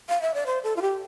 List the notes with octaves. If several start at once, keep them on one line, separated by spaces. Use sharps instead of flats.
F5
E5
D5
C5
A4
F4
G4